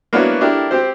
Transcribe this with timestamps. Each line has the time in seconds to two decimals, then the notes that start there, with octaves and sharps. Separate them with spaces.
0.13 A#3 B3 D4 E4 F#4 C#5
0.41 D4 E4 G4 A4 A#4
0.71 C4 G4 C5